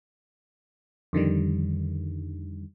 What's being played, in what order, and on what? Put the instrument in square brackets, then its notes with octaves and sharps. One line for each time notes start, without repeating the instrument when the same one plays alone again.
[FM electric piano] F2 D3 D#3 G3